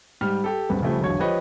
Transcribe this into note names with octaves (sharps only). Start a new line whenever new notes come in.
G#2 G3 F6
G4 A4
D1 G2 C4 B4
C#3 F3 G3 A3
E1 B1 D3 F#4 C#5 G#6
F3 G4 B4 C#5 D#5